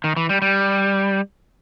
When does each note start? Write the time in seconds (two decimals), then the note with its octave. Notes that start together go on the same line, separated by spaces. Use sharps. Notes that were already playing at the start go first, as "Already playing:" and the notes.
0.04 D#3
0.16 E3
0.29 G3
0.42 G3